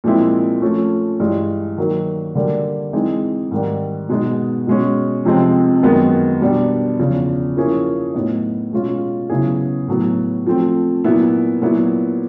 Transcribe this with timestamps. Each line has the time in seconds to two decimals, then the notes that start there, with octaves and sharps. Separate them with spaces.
0.04 A#2 F3 G#3 C4 E4
0.62 F3 A3 C#4
1.20 G2 E3 G#3
1.78 D#3 F#3 A#3 D#4
2.35 D3 G3 A#3
2.93 E3 G#3 C4 D#4 G#4
3.51 G#2 D#3 G3
4.09 B2 G#3 B3 D#4
4.67 B2 G#3 C#4
5.25 F2 C3 F3 G#3 C4
5.83 F#2 D#3 G#3 B3
6.41 B2 G3 B3 D4
6.98 E2 C#3 F3
7.57 F3 A#3 C#4 E4 G#4
8.14 A2 F#3 B3 D#4
8.72 B2 G#3 C#4 F4
9.30 C#3 F#3 B3 E4 G#4
9.88 A2 F#3 B3
10.46 F3 A3 C4
11.04 A#2 F#3 B3 E4
11.62 A#2 F#3 B3 E4